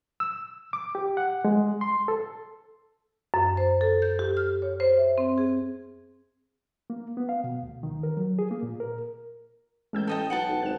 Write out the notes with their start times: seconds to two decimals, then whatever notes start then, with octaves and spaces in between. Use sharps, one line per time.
0.20 E6
0.73 D6
0.95 G4
1.17 F#5
1.45 G#3
1.81 C6
2.08 A4
3.34 F#2
3.57 C5
3.81 A4
4.02 G6
4.19 G4
4.37 F6
4.62 C#5
4.80 C5
4.98 E5
5.18 C4
5.38 G#4
6.90 A#3
7.17 B3
7.29 F5
7.44 B2
7.63 D2
7.83 D#3
8.03 A#4
8.17 F#3
8.39 G#4
8.51 A#3
8.63 A#2
8.80 A#4
9.93 A1 G#3 E6 G6
10.07 A4 D#5 G5
10.30 B1 F#5 G5 A5
10.49 B1
10.63 G#1 F#6 E7